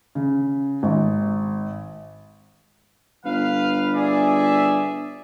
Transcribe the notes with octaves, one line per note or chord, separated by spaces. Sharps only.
C#3
G#1
G1 B4 F5
G#4 D5 E5